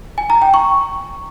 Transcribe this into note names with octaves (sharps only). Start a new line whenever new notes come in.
G#5
A#5
G5
C#6